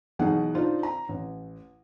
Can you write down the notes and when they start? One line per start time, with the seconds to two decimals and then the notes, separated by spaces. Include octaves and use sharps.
0.19 B1 B2 E3 D#4 G#4 F#5
0.55 D4 D#4 F4 C5
0.83 A#5
1.09 A1